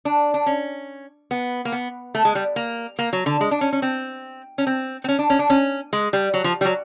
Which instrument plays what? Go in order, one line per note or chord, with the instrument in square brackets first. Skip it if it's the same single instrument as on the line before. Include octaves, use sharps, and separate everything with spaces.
[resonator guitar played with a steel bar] D4
D4
C#4
B3
A#3
B3
A3
G#3
G3
A#3
A#3
F#3
D3
G#3
D4
C#4
C#4
C4
C#4
C4
C4
C#4
D4
C#4
D4
C#4
G#3
G3
F#3
F3
G3
F#3